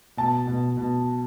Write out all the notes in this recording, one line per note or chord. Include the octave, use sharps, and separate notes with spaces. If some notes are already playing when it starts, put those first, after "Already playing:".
B2 A5
B2
B2